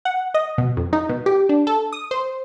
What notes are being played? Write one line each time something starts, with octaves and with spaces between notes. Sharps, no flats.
F#5
D#5
B2
F2
D#4
B2
G4
D4
A4
D#6
C5